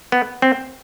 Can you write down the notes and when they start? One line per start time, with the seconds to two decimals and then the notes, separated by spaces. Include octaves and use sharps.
0.12 B3
0.42 C4